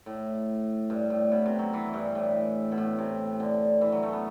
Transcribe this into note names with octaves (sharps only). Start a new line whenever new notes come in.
A2
G2
A2
B2
C3
F#3
E3
G2
A2
B2
A2
C3
D3
E3
F#3
A3
B3